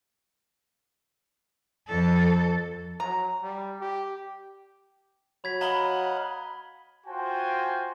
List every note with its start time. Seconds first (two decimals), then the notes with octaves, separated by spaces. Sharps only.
1.88 F2 A4
3.00 F#3 A#5
3.42 G3
3.81 G4
5.44 F#3 B5 G#6 B6
5.61 D#5 F5 F#5 A#5 B5 F#7 G7
7.07 F4 F#4 C5 G5 G#5